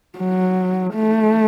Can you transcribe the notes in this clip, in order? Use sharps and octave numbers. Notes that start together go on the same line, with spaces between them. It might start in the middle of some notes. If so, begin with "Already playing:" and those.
F#3
A3